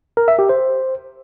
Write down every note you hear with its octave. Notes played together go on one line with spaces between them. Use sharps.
A#4
E5
G4
C5